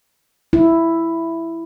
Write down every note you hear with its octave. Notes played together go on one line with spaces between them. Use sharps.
E4